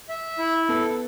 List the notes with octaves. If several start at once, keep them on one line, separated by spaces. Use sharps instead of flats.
E5
E4
B3 A4